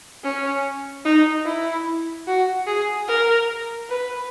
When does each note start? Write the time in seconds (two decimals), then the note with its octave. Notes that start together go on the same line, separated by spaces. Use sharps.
0.24 C#4
1.05 D#4
1.46 E4
2.27 F#4
2.67 G#4
3.08 A#4
3.89 B4